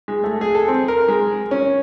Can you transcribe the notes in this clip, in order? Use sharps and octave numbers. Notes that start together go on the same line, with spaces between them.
G#3
A3
G#4
A4
C4
A#4
G#3
C#4